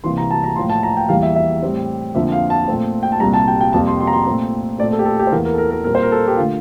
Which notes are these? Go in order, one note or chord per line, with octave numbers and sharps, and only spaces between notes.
C2 C3 E3 A#3 C6
A#5
A5
A#5
A2 F3 A#3 C6
A5
A#5
G5
E2 E3 G3 A#3 F5
E5
E5
A2 G3 C4
F2 D3 F3 A#3 E5
F5
A5
A#2 A3 C4
G5
A5
C2 A#2 G3 A#5
A5
G5
G5
F2 C3 G3 A#3 A5
C6
C6
A#5
C6
A#2 A3 C4
A#2 A3 C4 D5
A4
G4
A4
G4
C5
E2 E3 A#3 A#4
A#4
A4
A#4
A#4
A#2 G3 C4 A#4
C5
A#4
A4
G4
D3 A3 F4